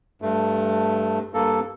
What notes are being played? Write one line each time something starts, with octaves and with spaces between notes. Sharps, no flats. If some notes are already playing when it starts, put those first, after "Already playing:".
G2 A3
G2 A#3 A4